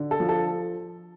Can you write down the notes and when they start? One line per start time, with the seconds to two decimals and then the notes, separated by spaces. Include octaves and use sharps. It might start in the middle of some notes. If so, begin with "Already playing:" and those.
Already playing: D3
0.11 A4
0.20 F3
0.29 A4